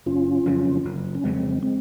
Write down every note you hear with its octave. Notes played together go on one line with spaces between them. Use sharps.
F#1 C#4 F4
F2 C#3 F#3
F#1
C#4
F2 C#3 F#3 G#3 C4
G#3 C4